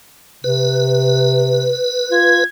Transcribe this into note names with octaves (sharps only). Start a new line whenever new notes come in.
C3 B4
F4 G#6